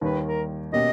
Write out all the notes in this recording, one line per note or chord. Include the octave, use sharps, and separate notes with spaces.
D#2 D#3 G3 B4
A#4
B2 A#3 C#4 G4 D#5